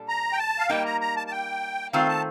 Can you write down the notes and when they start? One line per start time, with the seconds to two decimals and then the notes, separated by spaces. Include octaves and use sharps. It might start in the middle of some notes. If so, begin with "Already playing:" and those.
Already playing: A#2 G3 D4 A4
0.08 A#5
0.33 G5
0.39 A5
0.59 F5
0.69 G3 A#3 D#4 G5
0.85 A#5
1.01 A#5
1.16 A5
1.27 A5
1.32 G5
1.93 D#3 A3 C4 F4 F5
2.08 A5